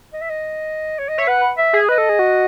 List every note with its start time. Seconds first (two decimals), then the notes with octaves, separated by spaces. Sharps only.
0.13 D#5
0.22 E5
0.30 D#5
0.99 C#5
1.09 D#5
1.18 C#5 E5
1.27 B4 F#5
1.58 E5
1.73 G#4
1.89 B4 D#5
1.98 A4
2.09 G#4
2.19 F#4